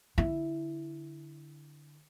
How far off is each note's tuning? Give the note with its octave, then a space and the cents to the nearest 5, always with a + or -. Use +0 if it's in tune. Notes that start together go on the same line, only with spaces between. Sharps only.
D3 +0 E4 +0